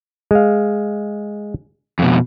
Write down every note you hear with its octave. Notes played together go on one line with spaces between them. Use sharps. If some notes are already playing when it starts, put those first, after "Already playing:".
G#3 F5
F2 B2